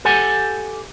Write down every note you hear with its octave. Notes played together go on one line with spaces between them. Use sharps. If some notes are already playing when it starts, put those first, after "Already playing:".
G4 A4 F#5 G#5